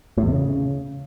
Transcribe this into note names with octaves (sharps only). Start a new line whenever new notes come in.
A2
E2
C3
C#3